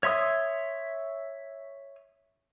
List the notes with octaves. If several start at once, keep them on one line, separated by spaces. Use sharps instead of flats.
C#5 E5 C6 D#6